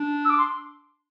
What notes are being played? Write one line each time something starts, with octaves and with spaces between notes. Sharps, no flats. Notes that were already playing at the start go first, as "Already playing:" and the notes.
Already playing: D4
E6
D6
C6